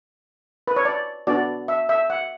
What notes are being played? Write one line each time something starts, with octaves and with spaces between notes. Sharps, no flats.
B4
C#5
D5
B3 D4 F#4 D5
E5
E5
F#5